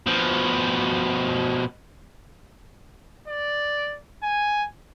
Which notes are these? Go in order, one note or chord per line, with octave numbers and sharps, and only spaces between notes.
B2 F3
D5
G#5